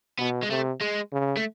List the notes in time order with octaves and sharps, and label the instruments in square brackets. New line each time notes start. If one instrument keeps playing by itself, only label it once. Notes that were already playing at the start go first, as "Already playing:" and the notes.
[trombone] B2 [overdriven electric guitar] B3
[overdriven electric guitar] G#3
[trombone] C3 [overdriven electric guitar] A3
[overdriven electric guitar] G#3
[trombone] C#3
[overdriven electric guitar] A3